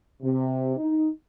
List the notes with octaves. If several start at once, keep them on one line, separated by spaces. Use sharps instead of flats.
C3
D#4